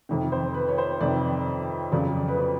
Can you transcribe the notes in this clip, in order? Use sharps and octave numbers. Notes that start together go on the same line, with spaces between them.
F2 C3 D#3
C5
B4
C#5
C5
F2 C3 D#3 D5
F2 C#3 F#3 D5
B4
C5